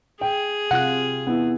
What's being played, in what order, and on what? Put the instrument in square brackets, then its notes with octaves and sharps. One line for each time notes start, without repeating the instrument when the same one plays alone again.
[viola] G#4 [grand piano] G5
[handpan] C3 F4 [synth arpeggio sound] F#5 F#6
[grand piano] B3 E4